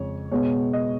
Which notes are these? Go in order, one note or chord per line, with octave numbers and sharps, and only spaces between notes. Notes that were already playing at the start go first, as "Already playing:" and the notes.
Already playing: F2 C#3 G#3 C#5
B2 G#3 B3 C#5
D#5